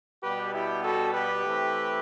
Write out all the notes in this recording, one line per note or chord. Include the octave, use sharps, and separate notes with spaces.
B2 G3 B3 G4 B4
E4 G4
F#4 A4
G4 B4
E3 A3 C4